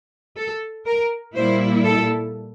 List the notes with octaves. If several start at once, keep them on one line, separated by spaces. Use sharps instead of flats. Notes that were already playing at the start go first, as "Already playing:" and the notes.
A4
A#4
A#2 G3 A#3 E4 C5
A4